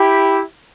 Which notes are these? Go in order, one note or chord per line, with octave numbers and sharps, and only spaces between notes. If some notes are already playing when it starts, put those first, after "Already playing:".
Already playing: E4 G4